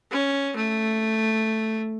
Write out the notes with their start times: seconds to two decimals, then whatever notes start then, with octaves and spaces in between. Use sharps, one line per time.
0.11 C#4
0.56 A3